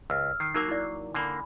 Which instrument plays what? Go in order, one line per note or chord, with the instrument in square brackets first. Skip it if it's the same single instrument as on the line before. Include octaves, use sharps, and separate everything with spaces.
[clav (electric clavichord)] C#2 [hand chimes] E6 F6
[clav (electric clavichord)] D#3 [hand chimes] C7
[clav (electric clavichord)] F#3 A#3 [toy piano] D#4 A#4 D6
[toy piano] E4 D5
[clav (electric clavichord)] D3 A#3 [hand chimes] G#5 B5